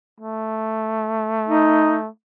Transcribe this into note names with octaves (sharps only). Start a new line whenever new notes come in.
A3
D#4